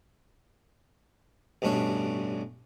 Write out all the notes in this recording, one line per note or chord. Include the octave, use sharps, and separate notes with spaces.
A1 G2 B2 D4 C#5